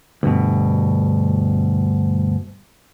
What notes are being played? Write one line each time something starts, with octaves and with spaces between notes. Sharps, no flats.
D2 G2 B2